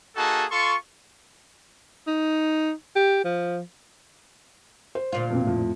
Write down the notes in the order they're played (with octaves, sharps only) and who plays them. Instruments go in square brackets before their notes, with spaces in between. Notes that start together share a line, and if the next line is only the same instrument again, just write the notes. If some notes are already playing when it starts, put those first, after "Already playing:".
[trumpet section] A#3 D#4 F#4 G#4 A4 A5
F4 A4 C6 C#6
[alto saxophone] D#4
G4
F3
[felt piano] C5
[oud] D2 A#2 F4
[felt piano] F2 B2 C4
F2 A2